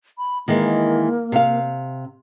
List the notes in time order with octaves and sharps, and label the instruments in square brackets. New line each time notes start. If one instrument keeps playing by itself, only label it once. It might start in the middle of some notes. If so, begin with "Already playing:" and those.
[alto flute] B5
[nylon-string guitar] D#3 E3 G#3 [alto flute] A#3
[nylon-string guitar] C3 F5